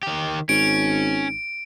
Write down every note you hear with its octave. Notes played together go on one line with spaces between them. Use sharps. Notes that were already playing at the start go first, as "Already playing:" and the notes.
D#3 G4
G#1 C#4 D7